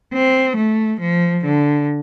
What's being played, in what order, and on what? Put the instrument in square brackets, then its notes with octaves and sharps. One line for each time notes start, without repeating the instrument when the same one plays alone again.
[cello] C4
A3
F3
D3